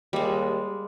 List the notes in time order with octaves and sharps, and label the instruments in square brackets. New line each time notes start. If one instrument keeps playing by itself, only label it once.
[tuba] D#2 [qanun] G3 G#3